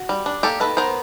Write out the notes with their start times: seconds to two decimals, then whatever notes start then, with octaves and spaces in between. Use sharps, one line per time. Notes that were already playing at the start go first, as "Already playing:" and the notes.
Already playing: F#4
0.09 G3
0.26 D4
0.43 A#3 G4 A4
0.60 D#3 A4 B4
0.77 B3 A#4 C5